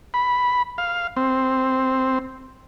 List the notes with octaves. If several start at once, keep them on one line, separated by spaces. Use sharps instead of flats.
B5
F5
C4